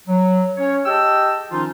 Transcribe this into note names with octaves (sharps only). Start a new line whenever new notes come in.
F#3
C#4 C#5
G4 G#4 D#5 G5 A5 E6
D#3 F3 C#4 D#4 F4